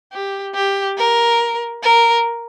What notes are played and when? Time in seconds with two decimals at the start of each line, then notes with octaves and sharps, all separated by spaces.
0.12 G4
0.55 G4
0.97 A#4
1.83 A#4